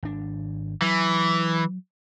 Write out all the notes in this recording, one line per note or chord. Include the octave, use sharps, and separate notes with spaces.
G#1 D4
E3 F#3